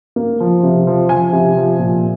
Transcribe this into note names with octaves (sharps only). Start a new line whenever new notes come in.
A#3
F3
C3
F3
F3 G#5
C3
F3
A#2